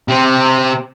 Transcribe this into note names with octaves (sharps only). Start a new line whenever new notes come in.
C3 C4